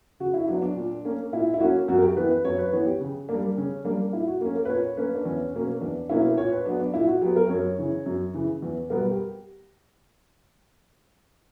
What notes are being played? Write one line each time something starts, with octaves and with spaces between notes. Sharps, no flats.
C#3 F#4
E4
F#3 B3 D4
D4
A#2
A#3 C#4
A#2 E4
E4
A#3 C#4 F#4
F#2 F#4
A#4
G4
E3 B3 B4
B4
F#2 C#5
B4
E3 B3 C#5
G4
C#3
G3 A#3 D4
C#3 C#4
G3 A#3 D4
A#2 E4
F#4
A#3 C#4
A#4
B4
A#2 C#5
A#3 C#4 B4
D4
E2 C#4
B2 A#3 C#4
E2 D4
B2 A#3 C#4 E4
A#2 C#5
B4
F#3 B3 D4
D4
A#2 E4
F#4
F#3 B3 G4
A#4
F#2 C#5
C#3 E3
F#2
C#3 E3
E2
B2 G3 B3 A#4
G4